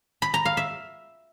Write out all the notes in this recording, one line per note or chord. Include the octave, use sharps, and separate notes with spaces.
B5
A#5
F5
E5